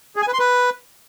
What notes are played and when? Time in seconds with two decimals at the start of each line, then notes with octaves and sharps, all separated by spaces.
0.16 G#4
0.22 G#5
0.28 B4
0.34 C6
0.39 B4